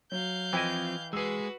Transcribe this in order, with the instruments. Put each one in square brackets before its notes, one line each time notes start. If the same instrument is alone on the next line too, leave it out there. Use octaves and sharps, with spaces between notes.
[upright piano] F#3 [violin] F5 G6
[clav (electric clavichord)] E3 E4 D#5 [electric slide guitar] F3 C4 [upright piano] G5
[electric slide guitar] G#3 G#4 [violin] F#4 B4 [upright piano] E6 C7